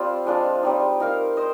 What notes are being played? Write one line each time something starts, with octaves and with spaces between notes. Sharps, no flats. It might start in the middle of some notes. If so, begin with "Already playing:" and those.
Already playing: G3 C4 F4 C5
F3 G#3 D4 F4
G3 C4 D#4
D#4 A#4 F5
C5 D#5